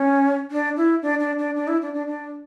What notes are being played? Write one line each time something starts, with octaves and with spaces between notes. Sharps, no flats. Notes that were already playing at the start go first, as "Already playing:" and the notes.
Already playing: C#4
D4
E4
D4
D4
D4
D4
E4
D4
D4
D4